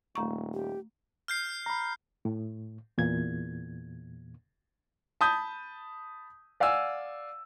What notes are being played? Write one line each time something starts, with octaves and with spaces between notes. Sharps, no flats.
D#1 A3 A#5 C#6
G4
F6 G6 C7
A#5 B5
A2
E2 A#2 G#6
A5 B5 D#6 G6
D5 F5 F#5 G#5 E6